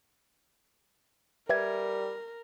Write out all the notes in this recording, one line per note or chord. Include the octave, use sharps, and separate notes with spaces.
G3 A#4 B4 E5 G#6